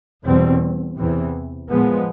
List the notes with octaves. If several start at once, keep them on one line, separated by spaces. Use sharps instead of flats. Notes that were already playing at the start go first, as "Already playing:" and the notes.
E2 B2 G3 C4
E2 C3 E3
A#2 F3 G#3 B3